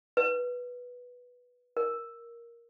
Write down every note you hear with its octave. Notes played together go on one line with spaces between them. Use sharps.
B4
A#4